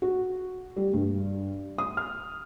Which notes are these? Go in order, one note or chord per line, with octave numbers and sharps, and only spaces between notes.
F#4
G3
G2
D#6
F6